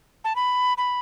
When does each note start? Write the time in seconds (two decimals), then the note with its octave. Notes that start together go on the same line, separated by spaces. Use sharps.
0.24 A5
0.36 B5
0.78 B5